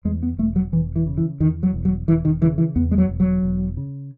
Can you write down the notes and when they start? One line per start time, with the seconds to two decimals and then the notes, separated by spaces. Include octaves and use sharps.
0.05 E2 G#3
0.23 B3
0.38 E1 A3
0.56 F#3
0.72 E1 E3
0.96 E3
1.07 C#3
1.17 E3
1.40 E2 D#3
1.63 F#3
1.74 E1
1.85 F#3
2.08 E1 E3
2.25 D#3
2.41 C#3 E3
2.58 E3
2.76 E2 B3
2.91 G#3
2.98 F#3
3.09 E1
3.20 F#3
3.43 E1
3.77 C#3